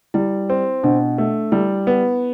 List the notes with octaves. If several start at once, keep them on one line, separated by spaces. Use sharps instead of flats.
G3 E4
C4
B2 D4
A3
G3 E4
B3